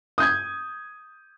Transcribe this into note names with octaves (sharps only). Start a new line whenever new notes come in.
D#6 G6 G#6